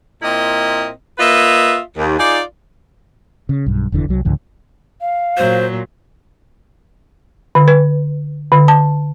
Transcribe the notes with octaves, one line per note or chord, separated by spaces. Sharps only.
A#2 C4 E4 A#4 D#5
A#3 F4 B4 D#5 E5
D#2
D#4 F4 G#4 D5
C#3
B1 G2
F1 E2 D3 E3
C2 F#3
C#2 G#2 D3 F3
F5
A#2 F#3 C5
D3
B4
D3
A5